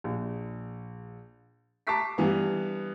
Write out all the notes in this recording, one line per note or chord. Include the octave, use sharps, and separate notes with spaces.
A#1
A5 A#5 C#6 D6 B6 C7
G2 E3 B3